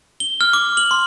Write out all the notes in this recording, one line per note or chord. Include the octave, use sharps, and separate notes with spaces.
G7
F6
D6
F#7
C6